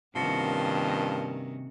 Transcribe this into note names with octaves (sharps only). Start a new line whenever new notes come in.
G2 C3 D#3 F3 A#3 C#4 F#4